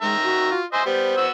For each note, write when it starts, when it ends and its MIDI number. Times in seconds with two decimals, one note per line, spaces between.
0.02 0.50 51
0.02 0.16 56
0.02 0.50 76
0.02 0.50 82
0.23 0.61 66
0.52 0.65 65
0.73 0.83 72
0.73 0.83 75
0.73 0.83 76
0.73 0.83 80
0.86 1.13 55
0.86 1.13 59
0.86 1.27 72
1.17 1.31 59
1.17 1.31 66
1.17 1.31 88